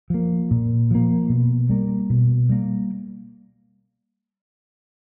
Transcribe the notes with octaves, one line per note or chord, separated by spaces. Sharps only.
F3 A#3
A#2
F3 A#3
B2
G3 A#3
B2
G3 A#3